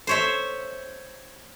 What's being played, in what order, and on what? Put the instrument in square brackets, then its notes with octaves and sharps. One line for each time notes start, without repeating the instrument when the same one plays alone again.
[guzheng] C5 C#5 E5